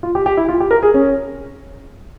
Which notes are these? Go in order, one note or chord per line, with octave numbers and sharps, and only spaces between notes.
F4
G4
G4
E4
F4
G4
A#4
G#4
C#4